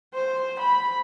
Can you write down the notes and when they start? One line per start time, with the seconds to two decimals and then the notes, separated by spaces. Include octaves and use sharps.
0.14 C5
0.59 B5